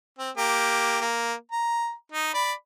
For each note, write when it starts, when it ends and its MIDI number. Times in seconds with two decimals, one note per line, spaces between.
0.19 0.30 60
0.38 1.01 58
0.38 1.01 67
1.01 1.33 58
1.52 1.92 82
2.12 2.33 63
2.34 2.53 74
2.34 2.53 83